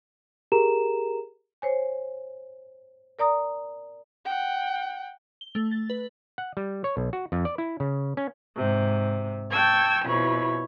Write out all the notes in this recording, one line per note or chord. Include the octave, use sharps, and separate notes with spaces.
G4 G#4 A#4 A#5 E7
C5 C#5 G#5
A#4 D5 A#5 D#6
F#5 G5
G7
A3
A6
B4
F#5
G3
C#5
B1
F#4
F2
D5
E4
C#3
C#4
G#2 C3
G5 A5 C#6 E6 G#6
F2 B2 E4 C#5 B5